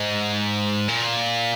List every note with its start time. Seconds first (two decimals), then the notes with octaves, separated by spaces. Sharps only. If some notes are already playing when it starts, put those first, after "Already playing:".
Already playing: G#2
0.88 A#2